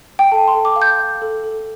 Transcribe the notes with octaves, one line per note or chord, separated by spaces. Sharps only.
G5
A4 A5
C6
A4
D6
F5
G6
F5
A4
A4